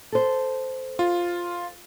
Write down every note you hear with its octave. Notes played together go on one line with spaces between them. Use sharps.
A4 C5
F4